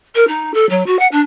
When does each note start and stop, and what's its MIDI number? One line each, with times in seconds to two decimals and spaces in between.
0.15 0.24 70
0.27 0.52 63
0.54 0.68 69
0.69 0.83 54
0.86 0.99 66
0.99 1.07 78
1.11 1.20 62